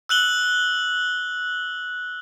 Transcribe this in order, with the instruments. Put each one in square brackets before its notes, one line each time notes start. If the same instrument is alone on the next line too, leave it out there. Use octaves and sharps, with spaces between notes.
[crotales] E6 F#6 F#7 G7